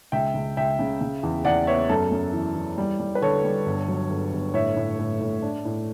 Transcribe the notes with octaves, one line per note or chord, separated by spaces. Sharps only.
C#2 E5 G5
C#2
C#2 E5 G5
C#3
C#3
E2
E2 D5 F#5
B3 C#5 E5
F#2 A4
F#2
E3
E3
G3
G3
B4
D3 A4 C#5
G3
G1
F#3
G1
G1
A2 C#5 E5
A2
A2
A2
D4
A2